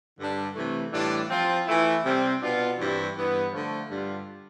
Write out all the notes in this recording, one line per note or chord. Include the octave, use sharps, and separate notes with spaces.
G2 D3 G3 D4
C3 E3 A3
A2 E3 G3 D4 F4
F3 C4 F4
E3 A3 E4
C3 G3 C4
B2 B3 D4 F4
G2 E3 G3 C4 E4
G2 E3 B3
D3 F3 A3
G2 D3 G3 D4 F4